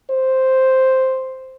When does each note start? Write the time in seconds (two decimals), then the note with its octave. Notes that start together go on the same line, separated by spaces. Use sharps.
0.11 C5